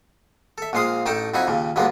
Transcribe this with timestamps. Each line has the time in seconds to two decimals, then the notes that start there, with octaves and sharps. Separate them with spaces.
0.58 A4 E5
0.73 A#1 A#2 G#3 F5 C6 D#6
1.06 A1 A3 D#4 A4 G5 A5
1.34 F2 F#3 D#4 E4 F#5 G#5
1.47 D#2 A#2 C#3
1.76 D2 G2 F#3 G#3 A#3 B3